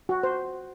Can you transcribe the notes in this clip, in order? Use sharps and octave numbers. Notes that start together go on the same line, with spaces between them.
F#4
C5